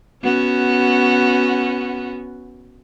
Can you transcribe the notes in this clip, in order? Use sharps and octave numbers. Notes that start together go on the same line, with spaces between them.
B3 C#4 F#4